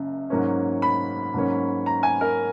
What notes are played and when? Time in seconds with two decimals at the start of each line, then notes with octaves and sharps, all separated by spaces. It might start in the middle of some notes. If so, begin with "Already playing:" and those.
Already playing: F#1 F#2 C#3
0.30 G#2 F#3 A#3 C#4
0.82 B5
1.34 G#2 F#3 A#3 C#4
1.86 A#5
2.03 G#5
2.21 A#4